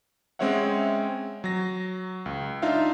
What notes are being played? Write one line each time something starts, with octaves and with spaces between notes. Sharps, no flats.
G#3 C4 C#4 C#5 E5 F#5
F#3 A#6
C#2
D4 D#4 F4 E5 F5